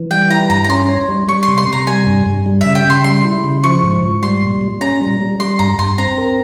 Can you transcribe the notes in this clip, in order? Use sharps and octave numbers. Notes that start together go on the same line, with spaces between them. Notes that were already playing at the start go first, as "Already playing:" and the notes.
Already playing: E3
G3 G5
E4 A#5
G2 A#5
A#5
C#4 C6
C#5
G3
G3 C#6
C6
C3
C6
C3
A#5
G3 G#5
G2
G2
G3
C#3 E5
G5
C#3 C6
G3 C6
E4
C#3
F3 C#6
G#2
G#2
G3 C6
A#2
A#2
C#4 A#5
G3
G3
G3 C6
G2 A#5
G2 C6
C4 A#5
A#4